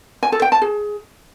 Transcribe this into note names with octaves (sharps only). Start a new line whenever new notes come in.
G#5
A4
G5
A5
G#4